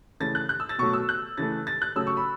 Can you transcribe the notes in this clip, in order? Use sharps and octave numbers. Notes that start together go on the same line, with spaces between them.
C#3 E3 A3 A6
F#6
F#6
E6
A6
B2 F#3 A3 C#6
E6
F#6
C#3 E3 A3 A6
A6
F#6
C#3 F#3 A3 E6
C#6
B5